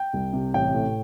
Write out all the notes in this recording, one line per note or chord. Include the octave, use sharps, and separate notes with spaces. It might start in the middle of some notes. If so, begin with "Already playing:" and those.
Already playing: G5
C2
C3
A1 G5
A2